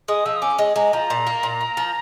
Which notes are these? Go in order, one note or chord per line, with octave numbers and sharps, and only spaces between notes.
G#3 D#6
F3 E6
D#6
C#4 D6
G#3
G#3 A#5
F3 A#5
A#2
A#3
A#2
A#3
F3